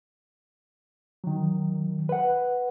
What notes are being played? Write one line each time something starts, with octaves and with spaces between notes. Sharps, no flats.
D#3 F#3
B4 F#5